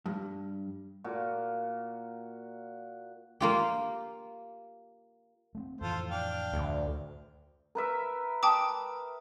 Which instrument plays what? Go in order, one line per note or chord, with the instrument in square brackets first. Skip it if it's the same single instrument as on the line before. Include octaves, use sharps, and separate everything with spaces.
[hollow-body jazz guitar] G2
[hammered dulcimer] A#2 F#4
[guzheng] A#3 F4 G4
[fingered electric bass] A3 B3 C4
[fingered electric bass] F2 A2 E3 [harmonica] F4 A4 C5
[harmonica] D4 F5 G5
[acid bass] D2
[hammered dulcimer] A#4 B4 E5
[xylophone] G5 A5 D6 [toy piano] D#6